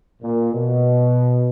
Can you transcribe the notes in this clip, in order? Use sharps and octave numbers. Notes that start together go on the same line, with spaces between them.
A#2
B2